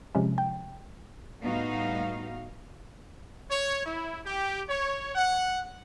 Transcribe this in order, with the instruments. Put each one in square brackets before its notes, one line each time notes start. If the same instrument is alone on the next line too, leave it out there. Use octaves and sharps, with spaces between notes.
[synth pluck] C3 F3 G#3 C#4
G5
[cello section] A2 G3 B3 D#4 F#4 F5
[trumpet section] C#5
E4
G4
C#5
F#5